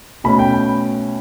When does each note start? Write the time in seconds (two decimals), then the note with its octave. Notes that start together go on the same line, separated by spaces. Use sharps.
0.24 B2 A3 C#4 B5
0.39 G5